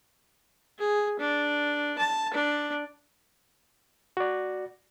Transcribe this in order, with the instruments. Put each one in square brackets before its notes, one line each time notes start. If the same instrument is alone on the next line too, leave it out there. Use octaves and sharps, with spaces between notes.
[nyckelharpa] G#4
D4
A5
D4
[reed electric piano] F#4 D5